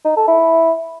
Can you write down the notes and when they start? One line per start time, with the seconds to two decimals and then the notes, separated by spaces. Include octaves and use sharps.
0.05 D#4
0.16 A4
0.28 E4